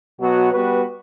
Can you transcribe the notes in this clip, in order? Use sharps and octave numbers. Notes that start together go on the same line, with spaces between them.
B2 F#3 B3 F#4
G3 B3 F#4 B4